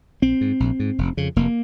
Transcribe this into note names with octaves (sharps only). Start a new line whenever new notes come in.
A#1 C4
G#2
A#1
G#2
F1
F2 C#3
F1 A#3